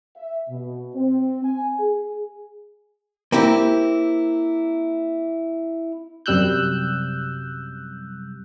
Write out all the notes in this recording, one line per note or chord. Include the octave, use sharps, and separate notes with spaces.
E5
B2
C4
G#5
G#4
A#3 C4 E4 G4
F#2 C3 G3 E6 F#6 G6